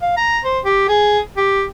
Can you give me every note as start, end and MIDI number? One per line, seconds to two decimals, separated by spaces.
0.02 0.13 77
0.17 0.39 82
0.44 0.59 72
0.65 0.85 67
0.89 1.19 68
1.37 1.64 67